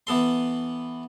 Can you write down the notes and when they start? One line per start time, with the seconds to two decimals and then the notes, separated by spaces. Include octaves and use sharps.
0.07 E3 B3 A4 C6